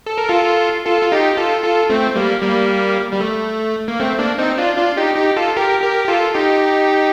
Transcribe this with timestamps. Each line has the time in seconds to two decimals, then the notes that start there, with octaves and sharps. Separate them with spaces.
0.06 A4
0.18 A#4
0.29 F4 A4
0.86 F4 A4
1.01 F4
1.12 D#4 G4
1.37 F4 A4
1.64 F4 A4
1.89 A3 C4
2.16 G3 A#3
2.42 G3 A#3
3.13 G3
3.20 A3
3.88 A#3
4.00 A3 C4
4.19 A#3 D4
4.38 C4 D#4
4.58 D4 F4
4.77 D4 F4
4.97 D#4 G4
5.16 D#4 G4
5.36 F4 A4
5.57 G4 A#4
5.82 G4 A#4
6.04 G4
6.08 F4 A4
6.34 D#4 G4